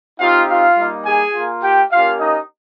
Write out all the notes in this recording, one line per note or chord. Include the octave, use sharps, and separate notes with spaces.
C4 D#4 F4 G4 F5
F4 F5
G3 A#3 D#4
G#4 G#5
A#3 F4
G4 G5
A#3 C#4 F4 G4 F5
D#4 D#5